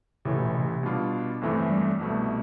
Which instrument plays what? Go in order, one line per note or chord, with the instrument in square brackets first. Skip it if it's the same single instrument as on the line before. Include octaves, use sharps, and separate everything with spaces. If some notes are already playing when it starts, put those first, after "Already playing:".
[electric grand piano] A1 A2 E3 A3 [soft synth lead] C3
[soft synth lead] B2
C3
[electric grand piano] B2 G3 D4 F4
G1 F2 E3 A3
[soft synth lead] G3
[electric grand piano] C2 B2 A3